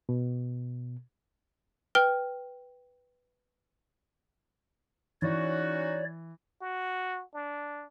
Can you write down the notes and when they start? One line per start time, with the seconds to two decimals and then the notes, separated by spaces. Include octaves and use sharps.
0.09 B2
1.95 B4 G5 F6 G7
5.22 E3 C#4 D#4 F#4 C#5 D5
6.61 F#4
7.34 D4